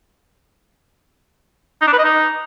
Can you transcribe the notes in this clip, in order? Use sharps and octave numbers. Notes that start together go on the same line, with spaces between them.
D#4
D4
B4
D#5
D#4